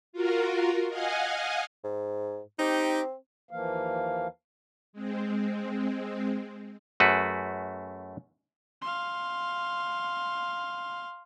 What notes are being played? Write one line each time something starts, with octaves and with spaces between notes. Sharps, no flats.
F4 F#4 A#4
D#5 F5 F#5 G#5
G#2
C4 D#4 G4
D#2 E3 F3 A#3 F5
G#3 C4
F#2 A3 F#4 G#4 B4
F5 C6